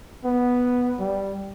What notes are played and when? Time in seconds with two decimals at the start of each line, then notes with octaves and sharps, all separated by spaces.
0.25 B3
0.99 G3